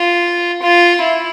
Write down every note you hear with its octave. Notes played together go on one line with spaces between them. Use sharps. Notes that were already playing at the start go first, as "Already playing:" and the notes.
Already playing: F4
F4
E4